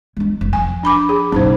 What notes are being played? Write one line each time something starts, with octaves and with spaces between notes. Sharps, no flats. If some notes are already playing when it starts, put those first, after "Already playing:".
G#3 D4
F1
F3 G#5
D4 B5 D6
G#4
F#1 B1 C#4 D#4 C5